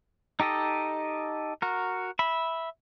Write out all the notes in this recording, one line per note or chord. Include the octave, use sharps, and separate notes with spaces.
D#4 G4 A4 D#5
F#4 A#4
E5 B5